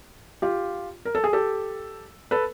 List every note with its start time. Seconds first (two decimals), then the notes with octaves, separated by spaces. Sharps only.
0.42 F4 G4
1.05 A#4
1.15 A4
1.24 G#4
1.33 G4 A4
2.31 A4 B4